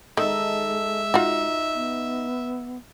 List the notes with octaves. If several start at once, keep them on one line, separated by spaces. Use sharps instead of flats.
D#3 G#3 D#4 A4 E5
D#4 F4 F#4
B3